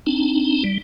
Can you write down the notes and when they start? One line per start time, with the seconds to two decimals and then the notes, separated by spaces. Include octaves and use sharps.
0.07 C4 D4 D#4
0.64 G3